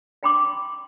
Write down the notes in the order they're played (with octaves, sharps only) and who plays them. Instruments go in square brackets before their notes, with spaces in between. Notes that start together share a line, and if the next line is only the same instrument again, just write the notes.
[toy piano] F5 G5 B5 C6 D6